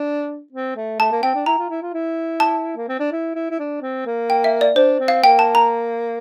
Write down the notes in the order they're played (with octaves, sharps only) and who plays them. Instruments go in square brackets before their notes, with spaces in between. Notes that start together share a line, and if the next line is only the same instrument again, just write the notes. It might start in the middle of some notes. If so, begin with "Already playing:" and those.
Already playing: [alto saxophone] D4
C4
A3
[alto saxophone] A3 [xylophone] A5
[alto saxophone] A#3
[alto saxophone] C4 [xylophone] G5
[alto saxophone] D4
[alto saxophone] E4 [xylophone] A#5
[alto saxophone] F4
E4
F4
E4
[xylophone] A5
[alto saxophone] A#3
C4
D4
E4
E4
E4
D4
C4
A#3
[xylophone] G5
E5
D5
[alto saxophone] D4 [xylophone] C5
[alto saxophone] C4
[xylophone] F5
[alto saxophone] A#3 [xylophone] G5
[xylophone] A5
A#5